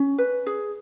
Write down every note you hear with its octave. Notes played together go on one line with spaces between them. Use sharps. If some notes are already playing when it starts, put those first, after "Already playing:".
Already playing: C#4
B4
G#4